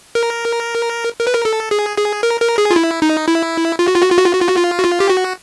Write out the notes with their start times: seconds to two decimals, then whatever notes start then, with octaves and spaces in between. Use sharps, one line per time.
0.15 A#4
1.19 A#4
1.27 B4
1.34 A#4
1.45 A4
1.71 G#4
1.98 G#4
2.23 A#4
2.41 A#4
2.58 G#4
2.71 F4
2.76 E4
3.02 D#4
3.28 E4
3.79 F4
3.88 F#4
3.95 F4
4.02 F#4
4.10 F4
4.18 F#4
4.25 F4
4.33 F#4
4.41 F4
4.48 F#4
4.56 F4
4.79 F#4
4.84 F4
5.00 G4
5.10 F#4